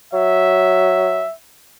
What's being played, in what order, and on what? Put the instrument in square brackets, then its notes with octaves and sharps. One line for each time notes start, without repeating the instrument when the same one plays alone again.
[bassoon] F#3 [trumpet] E5